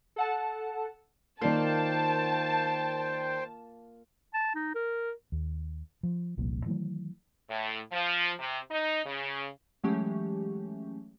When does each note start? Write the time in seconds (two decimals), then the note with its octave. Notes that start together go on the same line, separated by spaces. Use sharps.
0.16 A4 F#5 A5
1.41 D#3 A#3 F4 C5 D5 G5 A5 C7
4.34 A5
4.55 D#4
4.75 A#4
5.32 D#2
6.03 F3
6.37 F1 C2 F2 A#2
6.66 D#3 E3 F#3 A3
7.50 A2
7.92 F3
8.39 C3
8.71 D#4
9.06 C#3
9.84 E3 F#3 G#3 A3 C#4 G4